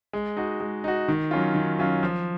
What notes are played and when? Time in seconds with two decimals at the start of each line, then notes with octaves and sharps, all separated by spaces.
0.13 G#3
0.37 D#4 F#4
0.60 G#3
0.84 D#4 F#4
1.08 D#3
1.31 F#3 C#4 F4
1.55 D#3
1.79 F#3 C#4 F4
2.03 F3